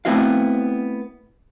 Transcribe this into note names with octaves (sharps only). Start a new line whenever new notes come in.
A3 B3 C4 E4 F#4 F5